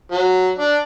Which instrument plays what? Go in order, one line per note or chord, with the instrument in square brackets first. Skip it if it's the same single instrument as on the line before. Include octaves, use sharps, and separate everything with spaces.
[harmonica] F#3
D4